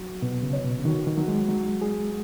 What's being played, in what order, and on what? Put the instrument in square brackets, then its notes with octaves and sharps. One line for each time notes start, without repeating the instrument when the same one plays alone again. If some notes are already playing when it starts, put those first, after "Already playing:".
Already playing: [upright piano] F#3 F#4
[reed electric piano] B2 [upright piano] B3
[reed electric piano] C#3
[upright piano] C#5
[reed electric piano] B2
C#3
[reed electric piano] D#3 [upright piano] F#4
[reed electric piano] D#3
[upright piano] F#3
[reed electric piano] G#3
[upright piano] F#3
G#4